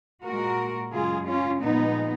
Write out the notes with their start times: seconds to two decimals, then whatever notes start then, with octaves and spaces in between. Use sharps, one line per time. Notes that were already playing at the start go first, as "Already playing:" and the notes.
0.24 A#2 G#3 F#4 A#4
0.92 F#2 C#3 G#3 F4 G#4
1.26 C#4 F4
1.61 A#2 F3 G#3 B3 D#4